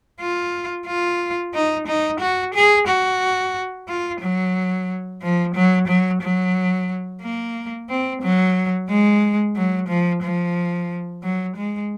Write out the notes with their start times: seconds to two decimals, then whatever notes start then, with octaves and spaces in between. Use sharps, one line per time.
0.20 F4
0.87 F4
1.54 D#4
1.87 D#4
2.20 F#4
2.54 G#4
2.87 F#4
3.88 F4
4.21 F#3
5.22 F3
5.55 F#3
5.88 F#3
6.22 F#3
7.22 A#3
7.89 C4
8.22 F#3
8.89 G#3
9.56 F#3
9.89 F3
10.22 F3
11.22 F#3
11.56 G#3